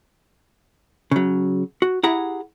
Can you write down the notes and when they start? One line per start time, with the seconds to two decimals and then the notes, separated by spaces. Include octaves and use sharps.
1.11 C#3 F#3
1.82 F#4
2.03 E4 G4 G#4 F#5 A#5